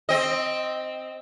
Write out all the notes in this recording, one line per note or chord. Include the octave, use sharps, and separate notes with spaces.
C4 D#5